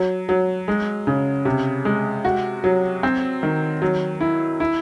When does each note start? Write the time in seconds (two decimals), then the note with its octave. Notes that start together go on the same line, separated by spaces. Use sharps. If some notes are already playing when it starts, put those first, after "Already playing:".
Already playing: F#3
0.29 F#3
0.68 G#3
1.07 C#3
1.45 C3
1.85 G#3
2.25 F#4
2.64 F#3
3.03 C4
3.43 D#3
3.82 F#3
4.21 E4
4.60 E4